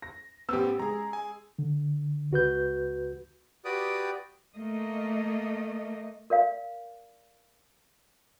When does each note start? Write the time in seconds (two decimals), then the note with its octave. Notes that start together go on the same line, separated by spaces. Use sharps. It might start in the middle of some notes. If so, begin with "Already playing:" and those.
0.02 A#6
0.49 A1 B3 C4 G4 E6
0.79 G#3 G#4 A#5
1.13 G#5
1.59 D3
2.31 C#2 F#4 B4 G6
3.65 F#4 G4 B4 D5 G5 D#6
4.57 A3 A#3 D#5
6.30 A#4 D5 F5